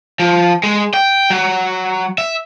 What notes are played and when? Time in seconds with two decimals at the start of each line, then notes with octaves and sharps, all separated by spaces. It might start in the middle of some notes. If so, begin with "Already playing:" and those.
0.20 F3
0.64 G#3
0.94 G5
1.30 F#3
2.18 E5